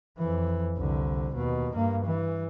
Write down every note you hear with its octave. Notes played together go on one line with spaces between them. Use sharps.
F2 E3
C2 D3
D#2 B2
G2 A#3
E3